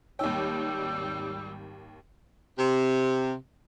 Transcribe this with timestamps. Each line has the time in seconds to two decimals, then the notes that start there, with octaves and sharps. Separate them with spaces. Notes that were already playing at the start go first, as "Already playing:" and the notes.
0.19 G#1 D#2 G3 D#4 C#5 G5 E6
2.59 C3